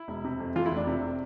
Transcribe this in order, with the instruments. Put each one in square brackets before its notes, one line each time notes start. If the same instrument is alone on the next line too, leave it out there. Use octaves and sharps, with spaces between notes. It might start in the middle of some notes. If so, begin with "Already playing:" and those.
Already playing: [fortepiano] E4
[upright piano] E1
C3
F2
[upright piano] E3 [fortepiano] F4
[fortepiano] E4
[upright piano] F1
[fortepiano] D4
[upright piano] C3